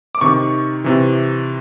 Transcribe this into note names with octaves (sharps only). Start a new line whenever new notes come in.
D6
C3 D#3 C#6
C3 E3